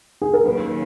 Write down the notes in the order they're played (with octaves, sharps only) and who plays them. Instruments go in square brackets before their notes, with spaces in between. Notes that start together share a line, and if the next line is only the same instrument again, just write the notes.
[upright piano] G#4
A#4
[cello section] D#2 C#3 F#3 [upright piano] B4